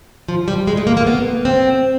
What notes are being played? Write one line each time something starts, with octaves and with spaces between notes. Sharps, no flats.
F3
G3
G#3
A3
A#3
A#3
B3
C4